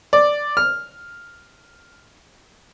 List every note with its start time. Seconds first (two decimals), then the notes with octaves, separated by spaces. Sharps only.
0.13 D5
0.57 F6